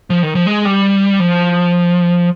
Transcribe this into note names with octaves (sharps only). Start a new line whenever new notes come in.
F3
D#3
F3
G#3
G3
F3